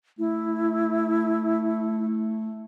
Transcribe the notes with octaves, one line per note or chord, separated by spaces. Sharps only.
A3 E4